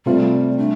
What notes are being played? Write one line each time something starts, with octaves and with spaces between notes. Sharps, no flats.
C3 G3 A3 C4 F4
A3 D4